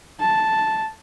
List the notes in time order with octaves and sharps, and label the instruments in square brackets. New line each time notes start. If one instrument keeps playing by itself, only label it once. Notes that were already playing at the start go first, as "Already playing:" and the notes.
[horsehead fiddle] A5